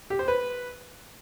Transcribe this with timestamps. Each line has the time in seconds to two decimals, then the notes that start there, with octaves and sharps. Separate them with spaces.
0.10 G4
0.19 C5
0.28 B4